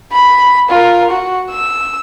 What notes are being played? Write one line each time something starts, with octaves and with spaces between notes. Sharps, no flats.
B5
F4 A#4
F#4
E6